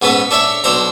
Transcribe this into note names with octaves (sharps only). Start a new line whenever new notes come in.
G#2 B3 C#4 A4 B4
D4 A4 C#5 E5
B1 D4 A4 C5 A#5